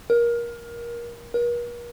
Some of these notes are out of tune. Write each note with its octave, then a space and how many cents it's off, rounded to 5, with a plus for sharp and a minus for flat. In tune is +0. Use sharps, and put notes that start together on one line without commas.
A#4 +20
A#4 +45